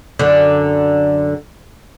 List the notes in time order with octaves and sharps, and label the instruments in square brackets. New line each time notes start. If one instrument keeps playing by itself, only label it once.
[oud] F#2 D3